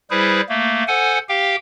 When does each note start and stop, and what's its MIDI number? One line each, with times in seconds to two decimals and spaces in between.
0.11 0.41 55
0.11 0.41 64
0.11 0.41 68
0.11 0.41 71
0.11 0.41 72
0.49 0.83 57
0.49 0.83 58
0.88 1.19 69
0.88 1.19 72
0.88 1.19 78
0.88 1.19 80
1.29 1.56 67
1.29 1.56 77
1.29 1.56 79